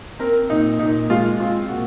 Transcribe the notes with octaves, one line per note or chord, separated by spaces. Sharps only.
C4 A#4
A#2 D#4
A#2 D#4
G#3 F4
C4 F4
A#2 F#4